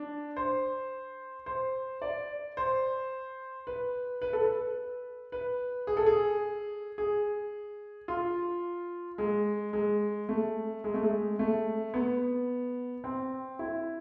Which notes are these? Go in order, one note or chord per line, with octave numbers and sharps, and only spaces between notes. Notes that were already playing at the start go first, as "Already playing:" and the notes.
Already playing: D4
C5
C5
D5
C5
B4
B4
A4
B4
B4
G#4
A4
G#4
G#4
F4
G#3
G#3
A3
G#3
A3
G#3
A3
B3
C4
E4